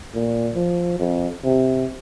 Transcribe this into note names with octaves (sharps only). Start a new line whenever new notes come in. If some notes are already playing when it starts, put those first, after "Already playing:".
A#2
F3
F2
C3